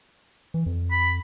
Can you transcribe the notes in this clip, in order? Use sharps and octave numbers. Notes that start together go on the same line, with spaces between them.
E3
F2
B5